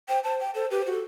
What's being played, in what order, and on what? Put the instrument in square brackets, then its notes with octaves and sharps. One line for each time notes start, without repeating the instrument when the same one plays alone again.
[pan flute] C5 [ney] G5
[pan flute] C5 [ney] A5
[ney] G5
[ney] A4 [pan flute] C5
[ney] G4 [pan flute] B4
[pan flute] C5
[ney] F#4 [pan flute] A4